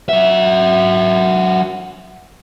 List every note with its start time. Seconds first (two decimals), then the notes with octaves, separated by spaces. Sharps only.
0.09 F#3 E5